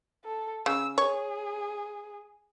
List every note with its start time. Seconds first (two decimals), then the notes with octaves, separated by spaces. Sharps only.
0.25 A4
0.66 C#3 E6
0.98 G#4 C#5